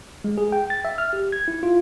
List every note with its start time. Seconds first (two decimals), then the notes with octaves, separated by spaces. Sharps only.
0.24 G#3
0.38 G#4
0.52 G5
0.70 A6
0.85 E5
0.98 F6
1.13 G4
1.32 G#6
1.48 E4
1.63 F4